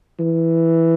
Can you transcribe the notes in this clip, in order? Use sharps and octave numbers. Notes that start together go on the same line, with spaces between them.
E3